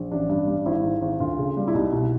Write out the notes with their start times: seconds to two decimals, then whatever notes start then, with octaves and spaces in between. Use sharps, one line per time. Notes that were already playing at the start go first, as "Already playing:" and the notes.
Already playing: A#1
0.11 A1 D4
0.30 G2
0.48 G3
0.66 G#1 E4
0.84 G#2
1.02 G#1
1.20 D2 F4
1.38 C#3
1.57 G3
1.68 E4
1.74 C2 D#4
1.92 B2 E4